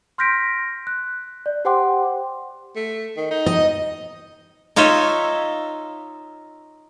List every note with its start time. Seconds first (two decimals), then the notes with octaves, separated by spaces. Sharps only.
0.18 C6 F6 G6 A#6 B6 D7
0.87 F#6
1.46 D5
1.65 G4 C5 F#5 G5 C6 D6
2.76 A3
3.17 D#3
3.31 D#4
3.46 D#5
4.76 D#4 F4 C#5 D#5 E5